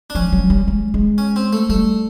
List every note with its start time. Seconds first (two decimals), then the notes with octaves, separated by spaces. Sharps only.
0.10 D4
0.15 F3 C#4
0.32 F#3
0.50 G3
0.68 G#3
0.94 G#3
1.18 C#4
1.36 C4
1.53 A3
1.69 G3 A3